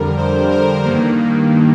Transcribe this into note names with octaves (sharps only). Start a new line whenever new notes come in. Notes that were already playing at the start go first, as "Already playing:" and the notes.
Already playing: F2 D3 G3 A#4
C5
A#4
G2 D#3 A#3